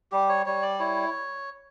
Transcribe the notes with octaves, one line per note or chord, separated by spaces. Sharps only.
G3 G4
C#5
G3 C#5
D5
E4 C#5